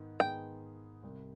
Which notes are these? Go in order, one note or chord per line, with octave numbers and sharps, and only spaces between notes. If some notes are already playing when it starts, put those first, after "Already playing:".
Already playing: G#2 D#3 B3 D#4
G#2 D#3 B3 D#4 G#4 G5
C2 C3 G3